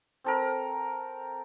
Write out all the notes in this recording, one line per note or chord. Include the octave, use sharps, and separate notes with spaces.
C4 A4 A#4